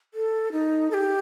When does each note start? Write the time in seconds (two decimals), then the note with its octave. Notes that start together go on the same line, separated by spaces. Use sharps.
0.14 A4
0.52 D#4
0.91 A4
0.94 G4